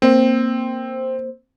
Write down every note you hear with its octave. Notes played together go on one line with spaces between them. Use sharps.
A#3 C4 C5